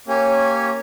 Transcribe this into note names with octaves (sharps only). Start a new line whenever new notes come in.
A#3 C#4 G4 C#5 G#5